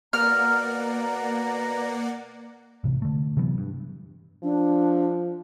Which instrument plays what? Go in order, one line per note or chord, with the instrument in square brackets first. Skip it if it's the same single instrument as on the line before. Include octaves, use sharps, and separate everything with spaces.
[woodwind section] B2 A#5 [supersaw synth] A#3 D5 F#5 [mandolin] F6
[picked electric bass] A1 C3
D3 A3
C3 E3 F#3 B3
G2
[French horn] F3 [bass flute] D4